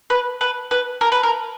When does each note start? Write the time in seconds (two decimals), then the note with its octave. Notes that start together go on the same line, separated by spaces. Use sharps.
0.10 B4
0.41 B4
0.71 B4
1.01 A#4
1.12 B4
1.23 A#4